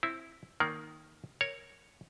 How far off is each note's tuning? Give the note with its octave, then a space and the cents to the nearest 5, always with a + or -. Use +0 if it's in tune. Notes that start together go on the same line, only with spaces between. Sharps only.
C4 +10 E4 +0
D#3 +0 A#3 +0 D5 -40
A#4 +0 C#5 +0